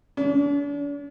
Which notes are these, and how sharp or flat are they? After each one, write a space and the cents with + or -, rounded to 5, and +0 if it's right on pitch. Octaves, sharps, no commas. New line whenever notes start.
D4 -45